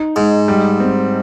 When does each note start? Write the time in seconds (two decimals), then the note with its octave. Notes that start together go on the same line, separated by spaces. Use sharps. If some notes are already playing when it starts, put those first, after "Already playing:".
Already playing: D#4
0.16 G#2 D#4
0.48 G3
0.80 C4